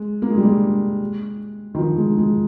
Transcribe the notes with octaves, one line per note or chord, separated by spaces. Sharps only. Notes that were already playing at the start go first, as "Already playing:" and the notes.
Already playing: G#3
A#3
G#3
G3
G#3
D#3
F3
G#3
G#3